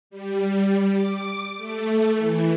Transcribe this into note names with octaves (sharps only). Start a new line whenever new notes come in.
G3
D6
A3
E3